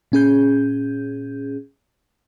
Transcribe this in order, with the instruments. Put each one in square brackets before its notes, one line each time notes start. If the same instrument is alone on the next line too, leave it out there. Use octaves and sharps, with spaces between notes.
[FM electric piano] A#2 C#4 G#4 G6